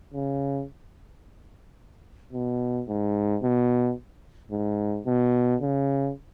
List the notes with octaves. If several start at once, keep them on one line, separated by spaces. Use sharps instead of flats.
C#3
B2
G#2
B2
G#2
B2
C#3